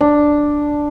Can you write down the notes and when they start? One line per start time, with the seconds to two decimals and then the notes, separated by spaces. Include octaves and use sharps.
0.01 D4